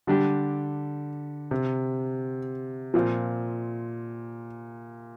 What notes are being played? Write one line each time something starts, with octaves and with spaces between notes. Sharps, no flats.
D3 G3 D4 G4
C3
A#2 F3 C4 F4